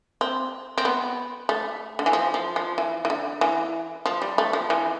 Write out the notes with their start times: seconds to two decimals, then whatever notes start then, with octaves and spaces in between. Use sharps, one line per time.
0.21 C4
0.78 C4
0.85 B3
1.49 A3
1.99 D3
2.06 E3
2.13 F3
2.34 F3
2.56 F3
2.78 E3
3.05 E3
3.10 D3
3.41 E3
4.06 F3
4.22 G3
4.38 A3
4.53 F3
4.70 E3